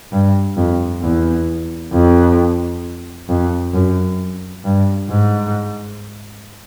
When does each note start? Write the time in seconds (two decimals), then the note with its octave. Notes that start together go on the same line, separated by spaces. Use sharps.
0.12 G2
0.57 F2
1.02 E2
1.93 F2
3.29 F2
3.74 F#2
4.65 G2
5.10 G#2